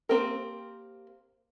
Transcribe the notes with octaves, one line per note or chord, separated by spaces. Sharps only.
A#3 C4 G4 A#4